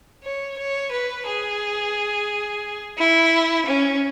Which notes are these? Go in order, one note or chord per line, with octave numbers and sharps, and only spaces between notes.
C#5
C#5
B4
G#4
E4
C#4